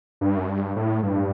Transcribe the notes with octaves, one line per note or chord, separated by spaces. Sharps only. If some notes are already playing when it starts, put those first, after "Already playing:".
G2
F#2
G2
A2
G2